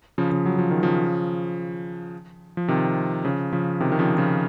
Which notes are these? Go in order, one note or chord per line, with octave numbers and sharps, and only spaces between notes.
C#3 F3
C#3 F3
F#3
F3
D#3
C#3 F3
F3
C3 D#3
C#3 F3
C#3 F3
C3 D#3
D#3
C#3 F3
C#3 F3